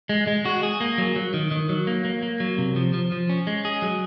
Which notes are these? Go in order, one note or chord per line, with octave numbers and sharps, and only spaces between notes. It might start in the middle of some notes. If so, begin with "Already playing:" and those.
G#3
G#3
F#4
G#4
A#3
F#3
F#3
D#3
D#3
F#3
A#3
A#3
A#3
F#3
C3
F3
F3
F3
C#4
G#3
G#4
F#3